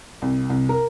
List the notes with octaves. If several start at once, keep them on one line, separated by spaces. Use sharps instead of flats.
C2
C2
A#4